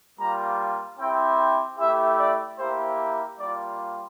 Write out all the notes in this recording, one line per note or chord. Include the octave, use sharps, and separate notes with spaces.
G3 A#3 F4 A#5
C4 E4 G4 G5
A3 E4 G4 E5
D5
A#3 E4 G4 C5
G3 A#3 F4 D5